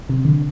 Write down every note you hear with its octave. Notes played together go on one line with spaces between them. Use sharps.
C3
D3